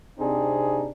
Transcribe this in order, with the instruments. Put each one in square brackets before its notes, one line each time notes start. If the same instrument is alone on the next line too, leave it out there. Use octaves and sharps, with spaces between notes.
[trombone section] C3 C4 D4 D#4 G#4